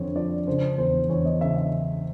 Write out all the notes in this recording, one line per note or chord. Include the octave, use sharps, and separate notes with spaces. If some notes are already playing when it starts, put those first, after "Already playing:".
Already playing: F2 D3 C5 C#5
F3 D5
C#3 C5
E2 C5
E2 C#5
D#5
C#3 E5
E5